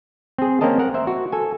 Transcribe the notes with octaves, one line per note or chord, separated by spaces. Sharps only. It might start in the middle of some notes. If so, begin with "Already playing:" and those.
C4 G#4
A#3 C4 C#4 A#4 D#5 A5
A#4 F#5
C5 E5
F#4
A4 G#5